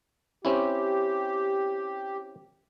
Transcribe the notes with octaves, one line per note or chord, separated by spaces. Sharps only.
C4 C#4 E4 G4